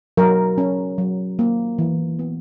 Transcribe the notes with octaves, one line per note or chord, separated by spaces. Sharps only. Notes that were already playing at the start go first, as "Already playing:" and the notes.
F#3 A#4
C#4
F#3
A#3
E3
B3